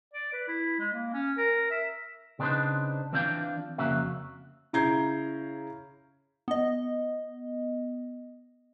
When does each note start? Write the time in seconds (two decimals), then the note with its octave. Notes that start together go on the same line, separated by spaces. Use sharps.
0.13 D5
0.33 B4
0.48 E4
0.79 G#3
0.93 A#3
1.13 C#4
1.37 A#4
1.71 E5
2.39 C#3 C4 D4 D#4 B4 C5
3.13 E3 C4 D4 F4 F5 G5
3.78 F2 C#3 A#3 F#4 E5
4.73 C#3 E4 A#5 G6 G#6 C7
6.48 B3 D#5